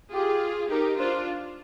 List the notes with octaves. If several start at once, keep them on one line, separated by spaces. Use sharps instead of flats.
F4 G4 G#4
D#4 G4 A#4
D4 F4 C5